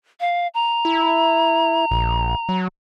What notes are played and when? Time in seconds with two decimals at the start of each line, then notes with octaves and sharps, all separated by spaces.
0.20 F5
0.54 A#5
0.85 E4
1.91 A#1
2.49 F#3